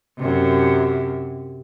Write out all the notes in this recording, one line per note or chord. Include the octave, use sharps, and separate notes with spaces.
F#2 C3